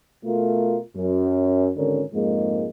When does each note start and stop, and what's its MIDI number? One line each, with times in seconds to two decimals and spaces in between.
0.24 0.78 47
0.24 0.78 57
0.24 0.78 65
0.24 0.78 70
0.96 1.70 42
1.77 2.02 32
1.77 2.02 50
1.77 2.02 61
1.77 2.02 70
2.14 2.67 41
2.14 2.67 44
2.14 2.67 56
2.14 2.67 58